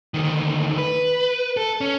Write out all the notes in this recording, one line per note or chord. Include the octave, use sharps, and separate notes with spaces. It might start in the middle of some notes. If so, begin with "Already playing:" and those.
D2 D#3
B4
A4
C#4